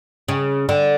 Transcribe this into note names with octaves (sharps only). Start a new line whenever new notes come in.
C#3
D3